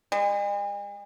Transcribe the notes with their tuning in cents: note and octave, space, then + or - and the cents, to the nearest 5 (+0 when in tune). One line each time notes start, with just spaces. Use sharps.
G#3 -45